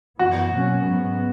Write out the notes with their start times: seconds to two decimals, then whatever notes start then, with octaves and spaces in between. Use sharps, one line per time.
0.19 F#2 E3 B3 F#4
0.52 B2 F#3 A#3 C#4
0.85 G#2 F#3 B3